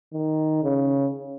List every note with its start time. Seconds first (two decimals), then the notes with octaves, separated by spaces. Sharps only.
0.13 D#3
0.63 C#3